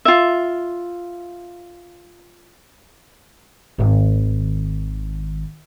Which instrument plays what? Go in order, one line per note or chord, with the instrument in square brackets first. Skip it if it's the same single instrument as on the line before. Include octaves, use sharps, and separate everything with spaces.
[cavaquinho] F4 E5
[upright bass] G#1 D#3